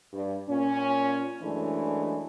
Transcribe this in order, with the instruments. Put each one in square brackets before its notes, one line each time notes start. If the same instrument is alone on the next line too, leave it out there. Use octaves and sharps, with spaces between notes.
[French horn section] G2
A#2 C#4
F#2 E3 G#3 A3 D4